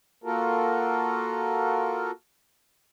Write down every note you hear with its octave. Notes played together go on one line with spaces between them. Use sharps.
A#3 F4 F#4 A4 A#4